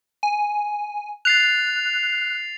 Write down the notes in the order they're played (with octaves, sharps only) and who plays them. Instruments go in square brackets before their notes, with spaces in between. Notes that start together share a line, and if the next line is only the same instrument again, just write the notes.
[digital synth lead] G#5
[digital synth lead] F#6 [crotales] A6 C7 F7